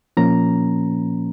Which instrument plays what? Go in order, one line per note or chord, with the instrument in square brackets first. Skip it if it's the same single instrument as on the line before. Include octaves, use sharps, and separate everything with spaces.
[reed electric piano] A#2 F3 A#3 C#4 A#5